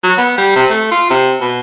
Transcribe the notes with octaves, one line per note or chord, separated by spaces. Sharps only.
F#3
B3
G3
C3
A3
F4
C3
B2